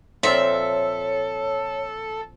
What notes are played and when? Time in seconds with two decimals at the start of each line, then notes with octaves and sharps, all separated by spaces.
0.23 A#2 F3 C4 A4 C#5 E5